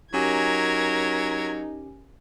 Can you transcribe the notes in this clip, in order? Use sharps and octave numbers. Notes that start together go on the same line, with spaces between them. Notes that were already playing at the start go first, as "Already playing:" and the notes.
F#3 C#4 D#4 G4 A#4 G#5 G#6